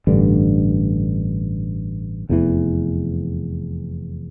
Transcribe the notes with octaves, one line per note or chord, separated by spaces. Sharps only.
A1 G2 D3
F1 E2 C3 E3